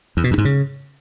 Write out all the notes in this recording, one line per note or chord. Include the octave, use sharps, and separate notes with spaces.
E2
B2
F2
G#2
C#3